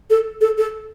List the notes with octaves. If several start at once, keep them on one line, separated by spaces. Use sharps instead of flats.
A4
A4
A4